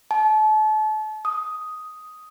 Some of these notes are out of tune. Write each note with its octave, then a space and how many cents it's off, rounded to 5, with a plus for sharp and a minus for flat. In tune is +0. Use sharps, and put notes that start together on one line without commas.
A5 -35
D#6 +5